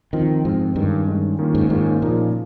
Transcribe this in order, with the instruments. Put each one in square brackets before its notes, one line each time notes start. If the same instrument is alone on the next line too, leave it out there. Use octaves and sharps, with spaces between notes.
[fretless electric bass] D#3 [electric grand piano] F3 C4 F4
[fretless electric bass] G#2 [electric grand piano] F3 C4 F4
[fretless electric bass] G2 [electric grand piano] D#3 G#3 C#4
[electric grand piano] D#3 G#3 C#4
D#3 A#3 C#4 F4
[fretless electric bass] G#2
[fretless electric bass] G#2 [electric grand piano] D#3 A#3 C#4 F4
[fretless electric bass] A#2 [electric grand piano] C#3 F3 A#3 D#4